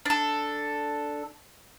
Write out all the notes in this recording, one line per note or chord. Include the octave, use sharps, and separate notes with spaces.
D4 A4